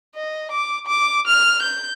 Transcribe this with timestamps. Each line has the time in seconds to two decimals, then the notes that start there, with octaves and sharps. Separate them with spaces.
0.15 D#5
0.51 D6
0.87 D6
1.27 F6
1.62 G6